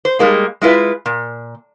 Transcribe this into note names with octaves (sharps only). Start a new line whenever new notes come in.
C5
G3 G#3 A#3 D#4
G#3 E4 F4 B4 E5
A#2